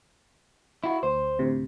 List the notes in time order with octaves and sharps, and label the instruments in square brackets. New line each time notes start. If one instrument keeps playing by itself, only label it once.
[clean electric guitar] E4 F#4
[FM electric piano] D2 [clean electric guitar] C5
[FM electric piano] D2 A2 C3